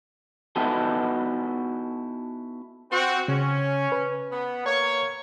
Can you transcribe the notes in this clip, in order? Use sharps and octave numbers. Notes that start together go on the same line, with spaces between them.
B3 D#4 E4 F#4 A4
C4 F#4
C#3 C#4
B4
B3
A#3 C#5